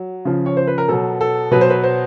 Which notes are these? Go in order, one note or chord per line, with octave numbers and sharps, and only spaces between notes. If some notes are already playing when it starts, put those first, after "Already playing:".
Already playing: F#3
C#3 F3
C#5
C5
B4
A#4
B2 F#3 A4
A4
B2 F#3 B4
C5
B4
C5